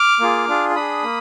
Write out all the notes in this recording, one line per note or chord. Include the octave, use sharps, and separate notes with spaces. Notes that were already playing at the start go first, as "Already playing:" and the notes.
Already playing: D6 F6
A#3 F4 G#4
D4 F4 G#4
D4 G#4 B5 D#6
A#3